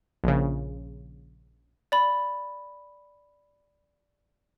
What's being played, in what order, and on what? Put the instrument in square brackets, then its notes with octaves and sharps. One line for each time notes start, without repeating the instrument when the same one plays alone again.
[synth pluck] A#1 C#3
[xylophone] D5 B5